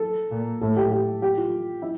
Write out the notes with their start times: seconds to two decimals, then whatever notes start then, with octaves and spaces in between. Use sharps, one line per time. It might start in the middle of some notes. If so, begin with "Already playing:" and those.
Already playing: A4
0.31 A#2
0.61 A2 A4
0.77 G4
0.92 G4
1.22 G4
1.37 F4
1.82 E4